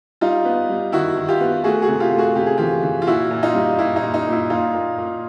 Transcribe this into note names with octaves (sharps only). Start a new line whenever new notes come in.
G3 D#4 F4
B3
G3
D#3 E4 F#4
D#3
F4 G4
B3
A3 F#4 G#4
F#4 G#4
C3
F4 G4
A3
F#4 G#4
C3 G4
G#4
E3 F4 G4
E3
F4
A#2 E4 F#4
A#2
D#4 F4
G3
A#2 E4
D#4
A#2
D#4
A#2
E4
A#2 D#4 F4
A#2
A#2